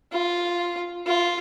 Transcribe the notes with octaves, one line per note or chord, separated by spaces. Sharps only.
F4
F4